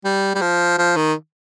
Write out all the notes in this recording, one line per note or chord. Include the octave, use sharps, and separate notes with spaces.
G3
G3
F3
F3
D#3